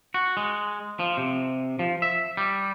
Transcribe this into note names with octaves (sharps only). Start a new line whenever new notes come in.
F#4
G#3
F3
C3
F3
E5
G3